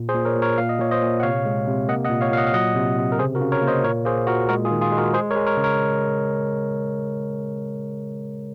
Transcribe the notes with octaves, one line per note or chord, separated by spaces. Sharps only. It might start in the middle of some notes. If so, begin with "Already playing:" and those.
Already playing: A#2
G#4 C5
A#2
A#4 C#5
A#2
A#4 C#5
A#2 F5
D#5
A#2 C#5
C5 D#5
A#2
F#5
C3 C#5 F5
G#3
C3
A#3 D#5 F#5
D#5 F#5
A#2
C#5 F5
A#2 F5
D#5 F#5
F5
F#3 D#5 F#5
C3
C3
A#4
C#3 G#4 C5
F#4 A#4
C#3
A#4 C#5
A#3
C5 D#5
A#2 A#4 C#5
A#3 G#4 C5
A#2 F#4 A#4
G#3 F#4 A#4
F4 G#4
D#3
F4 G#4
G#3
F#4 A#4
G#3 G#4 C5
A#4 C#5
G#3
A#4 C#5
C#3
A#4 C#5